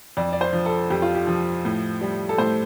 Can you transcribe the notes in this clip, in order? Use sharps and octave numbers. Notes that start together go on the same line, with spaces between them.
F2 D5
D5
C5
F3
A4
F2 G4
F4
G4
F3
A2
G3
A4
A2 C5